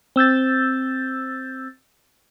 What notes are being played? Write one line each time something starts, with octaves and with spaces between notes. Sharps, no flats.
C4 E6 G6 A6